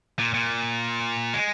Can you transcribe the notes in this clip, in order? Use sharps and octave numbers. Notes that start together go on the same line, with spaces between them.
A#2
A#2
G#3